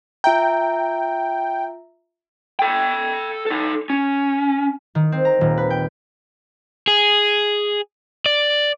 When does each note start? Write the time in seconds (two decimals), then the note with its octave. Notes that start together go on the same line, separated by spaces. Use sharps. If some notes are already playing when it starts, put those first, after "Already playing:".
0.24 F4 E5 G5 A#5
2.59 A4 G5
3.46 D#4 A4
3.90 C#4
4.95 D#3
5.12 C4
5.25 A#5
5.41 D#1
5.58 B4
5.70 G5
6.87 G#4
8.26 D5